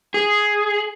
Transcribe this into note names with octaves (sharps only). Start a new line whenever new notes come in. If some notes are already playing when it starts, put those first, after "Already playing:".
G#4